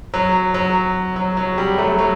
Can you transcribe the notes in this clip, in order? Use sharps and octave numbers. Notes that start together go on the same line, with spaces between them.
F#3
F#3
F#3
F#3
G3
F#3 A3
F#3